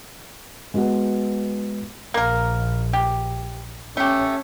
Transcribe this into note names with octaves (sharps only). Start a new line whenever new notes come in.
G#3 B3 F#4 B4 F#5
A#1 A#3 A#4
G4
A3 C#4 G4